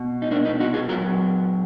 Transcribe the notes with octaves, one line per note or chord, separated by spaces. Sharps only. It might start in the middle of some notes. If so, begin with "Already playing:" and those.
Already playing: B2
D#4
A#3 D4
B3 D#4
D#4 F#4
F4 G#4
A#2 F#3 F#4 A#4